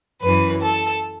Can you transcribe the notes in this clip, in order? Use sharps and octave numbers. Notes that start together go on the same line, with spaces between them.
F#2 E3 B4
A4